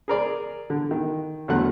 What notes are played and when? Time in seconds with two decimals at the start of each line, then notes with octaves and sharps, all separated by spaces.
0.08 G#4 A#4 D5
0.70 D3
0.91 D#3
1.48 E2 D3 F#3 A3 F#5 F#6